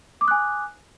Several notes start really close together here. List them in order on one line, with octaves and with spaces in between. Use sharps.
D6 D#6 F#6 G#5